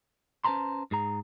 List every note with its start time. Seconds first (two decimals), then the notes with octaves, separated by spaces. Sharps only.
0.44 C#4 B4 C5 A5 A#5 C6
0.91 G#2 G#4 A#5